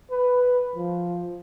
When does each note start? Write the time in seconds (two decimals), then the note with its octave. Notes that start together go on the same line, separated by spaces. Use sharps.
0.10 B4
0.76 F3